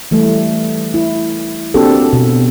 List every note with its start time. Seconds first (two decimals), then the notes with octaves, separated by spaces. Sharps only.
0.11 E3 G3 A3
0.94 E4
1.74 A#3 C4 D4 F#4 G4 A4
2.13 B2